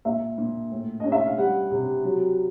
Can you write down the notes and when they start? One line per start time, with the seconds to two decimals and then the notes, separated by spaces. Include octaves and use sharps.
0.05 A#2 E5
0.38 A#2
0.72 A2
1.00 C#4 D#5
1.12 E5
1.26 F5
1.38 G3 F#5
1.71 C3
2.04 F#3